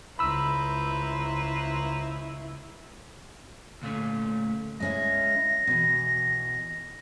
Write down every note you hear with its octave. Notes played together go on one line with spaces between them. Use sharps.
C#2 E4 B4 C5 A#5 B5 E6
D2 A#2 A3 C#4
G#3 C#4 E4 A#6
B2 E3